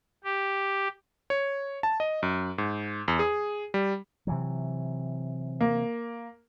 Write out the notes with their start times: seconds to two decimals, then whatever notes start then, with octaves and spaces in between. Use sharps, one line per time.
0.24 G4
1.30 C#5
1.83 A5
2.00 D#5
2.23 F#2
2.58 G#2
3.08 E2
3.19 G#4
3.74 G3
4.27 C3 E3 F#3
5.61 A#3